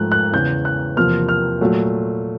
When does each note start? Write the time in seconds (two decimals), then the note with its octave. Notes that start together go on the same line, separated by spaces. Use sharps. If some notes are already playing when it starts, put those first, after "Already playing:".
Already playing: G#2 F3 A3 F#6
0.12 F#6
0.32 E2 C#3 E3 G6
0.65 F#6
0.96 E2 C3 F3 A#3 F6
1.28 F6
1.61 A#2 F#3 A3